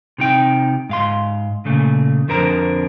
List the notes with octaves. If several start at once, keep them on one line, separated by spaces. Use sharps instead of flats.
C3 D#4 G5
G#2 F5 C6
A#2 C#3 A3
F2 D3 A#4 C5 A#5